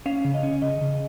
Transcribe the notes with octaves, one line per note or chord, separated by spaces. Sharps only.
C#4 F5
C#3
D#5
C#4
C#3 D#5
C#3